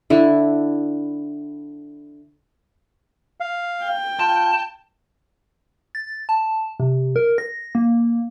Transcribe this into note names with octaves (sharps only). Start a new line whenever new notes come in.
D3 E4
F5
G5
F4 A5
A6
A5
C3
A#4
A#6
A#3